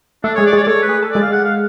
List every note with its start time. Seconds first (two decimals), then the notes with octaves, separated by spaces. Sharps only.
0.23 A3 D4 A4
0.35 G#3 G#4 C#5
0.46 D5
0.53 G#3 G#4 C#5
0.63 D5
0.67 A3 A4 C#5
0.82 B4
0.89 G#4
1.03 A4
1.11 G#3 G#4 D5
1.22 F5
1.33 F#5
1.44 F5